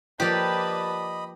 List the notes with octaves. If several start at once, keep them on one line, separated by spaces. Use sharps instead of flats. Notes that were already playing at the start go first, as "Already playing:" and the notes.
F3 A#3 G4 B4 D5 D#5 A5 B5